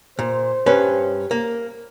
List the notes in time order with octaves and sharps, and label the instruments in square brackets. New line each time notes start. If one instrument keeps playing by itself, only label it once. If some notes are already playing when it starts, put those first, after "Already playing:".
[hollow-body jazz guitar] A#2 [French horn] C5
[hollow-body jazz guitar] G2 C#4 B4
A#3